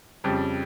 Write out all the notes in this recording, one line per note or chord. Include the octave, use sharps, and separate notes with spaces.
F2 C#3 G3